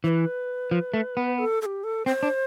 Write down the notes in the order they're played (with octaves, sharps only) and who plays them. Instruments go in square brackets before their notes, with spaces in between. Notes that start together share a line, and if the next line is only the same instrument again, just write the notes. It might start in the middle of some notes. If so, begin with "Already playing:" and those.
[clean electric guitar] E3 [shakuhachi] C5
[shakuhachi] B4
[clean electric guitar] F3
A3
B3
[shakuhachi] A4
A4
G4
A4
[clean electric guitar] C4 [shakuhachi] C5
[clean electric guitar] D4